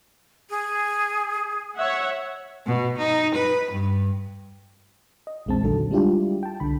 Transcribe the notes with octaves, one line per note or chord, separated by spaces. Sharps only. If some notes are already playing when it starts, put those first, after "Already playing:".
G#4
C#5 E5 F#5
B2
D#4
B4
G2
D#5
A#1 E2 G#3 C4 A5
A#1 D3 D#3 F#3 A4
G3 G#3 D4 E4 F4 G4
G5 A5
C2 D3 B5